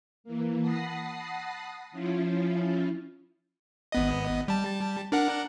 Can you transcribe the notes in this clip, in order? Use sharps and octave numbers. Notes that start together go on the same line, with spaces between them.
E3 A#3
F#5 A5 B5 D#6 A#6 C7
F3 C#4 E4 F4
G#1 B3 D#5
G3 A5
D4 A#4 F#5